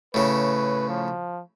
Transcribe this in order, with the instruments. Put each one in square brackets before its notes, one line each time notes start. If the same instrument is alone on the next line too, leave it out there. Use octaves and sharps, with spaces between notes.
[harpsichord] A2 C#3 [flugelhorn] B4
[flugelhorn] F3